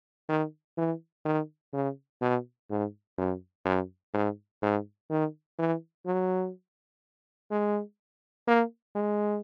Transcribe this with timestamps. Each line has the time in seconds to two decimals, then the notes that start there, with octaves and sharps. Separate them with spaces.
0.29 D#3
0.78 E3
1.25 D#3
1.73 C#3
2.21 B2
2.70 G#2
3.18 F#2
3.66 F#2
4.14 G#2
4.62 G#2
5.10 D#3
5.59 E3
6.06 F#3
7.51 G#3
8.48 A#3
8.95 G#3